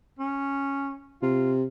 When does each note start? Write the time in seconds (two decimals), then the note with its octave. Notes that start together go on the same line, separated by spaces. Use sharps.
0.19 C#4
1.23 C3 F4